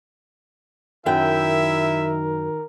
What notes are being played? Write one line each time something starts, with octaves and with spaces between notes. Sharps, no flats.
F#2 D#3 E4 A#4 E5 G5